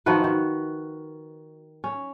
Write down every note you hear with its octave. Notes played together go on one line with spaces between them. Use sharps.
D#3 F3 F#4 B4
D#3
C#4